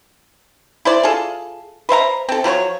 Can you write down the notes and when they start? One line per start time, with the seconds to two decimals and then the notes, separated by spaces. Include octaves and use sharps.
0.85 E4 C5 D5
1.03 F4 G#4 A4
1.89 B4 C5 E5 A#5
2.29 C4 A4
2.44 F3 F#3 B4 C#5